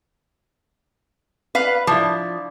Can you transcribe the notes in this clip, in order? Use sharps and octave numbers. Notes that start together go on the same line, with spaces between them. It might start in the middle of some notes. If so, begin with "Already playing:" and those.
B4 F5
F3 D4 E4